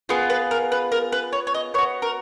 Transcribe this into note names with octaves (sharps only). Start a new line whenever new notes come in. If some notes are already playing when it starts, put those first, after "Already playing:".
B3 F4 G#4
B4
A#4
B4
A#4
B4
C#5
C#5
D#5
B3 F#4 C#5
A#4